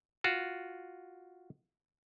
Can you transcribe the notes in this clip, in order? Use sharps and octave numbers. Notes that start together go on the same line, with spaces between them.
F4 F#4